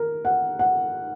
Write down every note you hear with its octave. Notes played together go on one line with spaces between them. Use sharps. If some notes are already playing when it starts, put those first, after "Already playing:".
Already playing: D#3 A#4
F#5
F#5